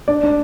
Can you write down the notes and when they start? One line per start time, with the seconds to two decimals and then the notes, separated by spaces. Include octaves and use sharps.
0.08 D4 D5
0.23 D4